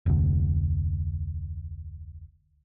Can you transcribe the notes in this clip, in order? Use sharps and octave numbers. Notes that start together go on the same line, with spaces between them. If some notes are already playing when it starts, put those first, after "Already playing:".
F1 D2